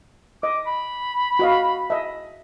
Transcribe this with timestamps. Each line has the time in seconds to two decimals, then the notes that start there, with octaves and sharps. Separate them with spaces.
0.43 D#5 D6
0.67 B5
1.39 F#4 D#5 F5
1.90 D#5 E5